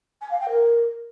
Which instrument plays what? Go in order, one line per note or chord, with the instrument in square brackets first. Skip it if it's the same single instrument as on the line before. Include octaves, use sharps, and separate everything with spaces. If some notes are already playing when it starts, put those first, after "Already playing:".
[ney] G#5
F5
G5
A#4